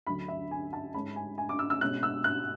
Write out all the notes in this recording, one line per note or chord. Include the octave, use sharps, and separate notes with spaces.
D2 D3 F#3 B5
E5
G#5
A5
G#2 G#3 C#4 B5
G#5
G#5
D6
E6
E6
B2 G#3 C#4 F#6
E6
F#6